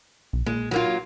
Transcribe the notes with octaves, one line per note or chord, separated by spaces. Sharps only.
B1
A#2 G#3
F#3 A#3 F4